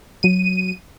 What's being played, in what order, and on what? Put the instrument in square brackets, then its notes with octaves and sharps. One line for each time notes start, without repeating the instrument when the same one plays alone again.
[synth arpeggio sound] F#3 D#7